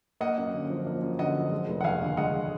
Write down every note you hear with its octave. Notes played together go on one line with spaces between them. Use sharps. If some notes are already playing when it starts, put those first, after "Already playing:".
A#3 D#5 F#5
F#2
D3
F3
A#3
F#2
D3 D#5 F#5
F3
G#3
F1
F#5
D#2 F5 G#5
D3
G#3 D#5 F#5